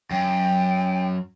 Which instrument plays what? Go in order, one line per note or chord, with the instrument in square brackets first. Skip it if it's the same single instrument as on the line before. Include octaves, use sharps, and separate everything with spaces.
[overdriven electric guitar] F#2 [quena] G5